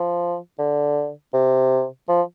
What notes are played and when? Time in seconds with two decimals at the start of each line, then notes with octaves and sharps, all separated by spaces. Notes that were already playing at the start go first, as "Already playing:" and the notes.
Already playing: F3
0.59 D3
1.34 C3
2.09 F3